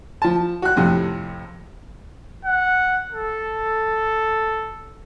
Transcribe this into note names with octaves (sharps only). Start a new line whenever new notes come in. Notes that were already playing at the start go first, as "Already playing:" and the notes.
F3 A5
F#4 F#6
F2 A2 C3
F#5
A4